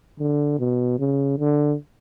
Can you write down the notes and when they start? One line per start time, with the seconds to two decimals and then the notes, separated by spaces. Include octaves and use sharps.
0.19 D3
0.59 B2
0.99 C#3
1.39 D3